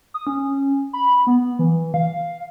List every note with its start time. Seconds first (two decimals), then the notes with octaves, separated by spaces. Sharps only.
0.14 D#6
0.27 C#4
0.93 B5
1.27 B3
1.59 E3
1.94 F5